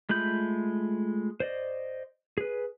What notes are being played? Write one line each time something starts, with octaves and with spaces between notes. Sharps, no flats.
G#3 A3 F4 B5 G6
C5 D5 D#5
G#4 B4